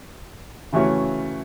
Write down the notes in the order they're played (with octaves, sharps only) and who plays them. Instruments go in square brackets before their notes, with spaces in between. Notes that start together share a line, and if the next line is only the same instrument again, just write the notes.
[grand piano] C#3 E3 A3 C#4 F#4